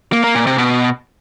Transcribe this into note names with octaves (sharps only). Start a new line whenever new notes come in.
A#3
A#3
A#2
C3
B2